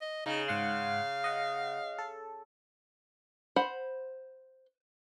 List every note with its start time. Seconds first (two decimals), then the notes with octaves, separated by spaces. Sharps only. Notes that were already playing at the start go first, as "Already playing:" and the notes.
0.01 D#5
0.26 C#3 D#4
0.48 G#2 F5 F#5 C6
1.24 D#5 F#5
1.98 A4
3.56 C5 F#5 B5